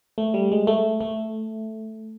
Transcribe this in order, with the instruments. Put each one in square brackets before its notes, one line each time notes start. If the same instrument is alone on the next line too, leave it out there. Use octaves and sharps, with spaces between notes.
[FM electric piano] A3
G3
G#3
A3
A3